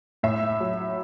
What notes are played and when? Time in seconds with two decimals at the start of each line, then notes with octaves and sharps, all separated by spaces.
0.23 A2 E5
0.60 F#3